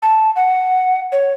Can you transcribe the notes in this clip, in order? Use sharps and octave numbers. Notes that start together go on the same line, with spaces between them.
A5
F#5
C#5